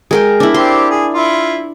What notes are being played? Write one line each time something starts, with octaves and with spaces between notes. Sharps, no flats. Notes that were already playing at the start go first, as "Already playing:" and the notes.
G#3 A#4 G5
D4 E4
C4 G4 C6
G#4
E4 F4